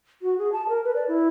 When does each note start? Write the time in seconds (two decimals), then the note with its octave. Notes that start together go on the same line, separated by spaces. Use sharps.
0.22 F#4
0.38 G#4
0.52 A5
0.69 A#4
0.84 B4
0.96 D5
1.08 E4